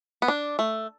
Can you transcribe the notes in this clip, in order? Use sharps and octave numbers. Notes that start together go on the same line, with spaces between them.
B3
D4
A3